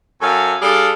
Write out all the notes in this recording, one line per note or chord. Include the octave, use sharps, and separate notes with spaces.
F#2 F#3 A4 F5 G#5
G3 D4 G#4 A4 F5